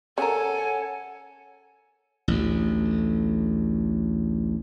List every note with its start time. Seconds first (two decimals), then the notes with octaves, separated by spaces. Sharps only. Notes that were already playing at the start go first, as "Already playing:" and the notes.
0.18 C#3 A4 A#4 C#5 F#5 G#5
2.28 A1 D2